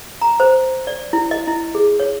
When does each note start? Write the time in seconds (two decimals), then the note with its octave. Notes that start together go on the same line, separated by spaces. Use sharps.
0.21 A#5
0.40 C5
0.87 D5
1.13 E4
1.31 D#5
1.47 E4
1.75 G#4
2.00 C#5